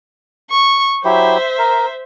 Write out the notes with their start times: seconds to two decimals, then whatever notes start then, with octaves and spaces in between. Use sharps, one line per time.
0.50 C#6
1.05 F#3 E4 G4 C5 E5
1.58 A#4